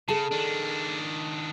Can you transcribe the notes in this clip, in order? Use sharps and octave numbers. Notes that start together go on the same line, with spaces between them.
C#3 G#4 A4 A5
D#3 D4